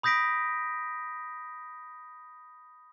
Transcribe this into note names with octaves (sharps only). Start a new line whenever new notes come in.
B5 D#6 G6 A#6 B6 D7